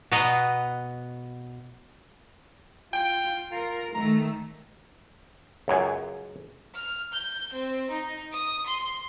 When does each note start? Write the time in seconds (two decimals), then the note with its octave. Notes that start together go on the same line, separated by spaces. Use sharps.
0.11 B2 B3 B4 D#5 A#5
2.93 F4 G5
3.51 F4 A#4
3.94 D#3 A3 A#5
5.68 C#2 F#2 G#5
6.75 F6
7.13 G6
7.52 C4
7.90 D#4
8.32 D#6
8.66 C6